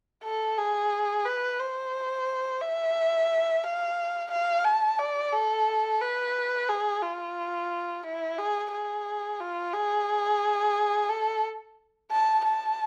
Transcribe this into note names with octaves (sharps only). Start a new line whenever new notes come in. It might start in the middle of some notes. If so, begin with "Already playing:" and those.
A4
G#4
B4
C5
E5
F5
F5
A5
D5
A4
B4
G#4
F4
E4
G#4
G#4
F4
G#4
A4
A5
A5